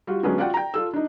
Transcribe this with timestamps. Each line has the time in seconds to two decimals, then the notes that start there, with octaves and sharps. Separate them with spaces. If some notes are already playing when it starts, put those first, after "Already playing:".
0.07 G3 F4 F#4
0.23 D3 F#3 G#3 B3 C#4 D4
0.38 F4 F#4 D5 F#5 G5
0.54 G5 A#5
0.74 F4 A4 E6
0.93 D4 D#4